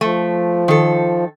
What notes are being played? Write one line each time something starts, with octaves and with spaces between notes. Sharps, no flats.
F3 A3
D#3 A4